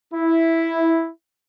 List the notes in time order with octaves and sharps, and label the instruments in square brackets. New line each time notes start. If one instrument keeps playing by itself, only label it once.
[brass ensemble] E4